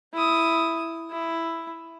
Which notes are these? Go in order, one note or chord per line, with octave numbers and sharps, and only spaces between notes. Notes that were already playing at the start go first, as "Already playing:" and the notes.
E4 D#6
E4